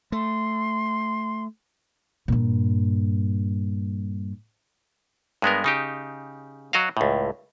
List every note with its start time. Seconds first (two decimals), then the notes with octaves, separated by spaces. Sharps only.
0.12 A3 C6
2.28 G2 A#2
5.42 G2 G#3 B3 A#4
5.64 C#3 D#4 G4
6.73 F#3 F#4 D#5 F5
6.97 C#2 A2